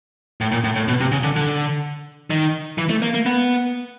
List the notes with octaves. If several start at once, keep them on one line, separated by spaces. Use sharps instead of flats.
A2
A#2
A2
A2
B2
C3
C#3
D3
D3
D#3
E3
A3
A#3
A#3
B3